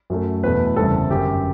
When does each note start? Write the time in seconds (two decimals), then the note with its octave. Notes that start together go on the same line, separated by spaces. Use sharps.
0.10 F#2 F#3 A3
0.43 E2 B2 A3 B4
0.76 F#1 E2 C3 E3 G3 A4
1.10 G1 F#2 F#3 G4